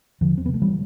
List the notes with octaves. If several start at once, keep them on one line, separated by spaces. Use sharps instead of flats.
E2 D3 F3
C4
C3 B3
A3
E3 G3